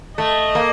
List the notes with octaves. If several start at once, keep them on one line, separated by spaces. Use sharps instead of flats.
A3 D#5
A#3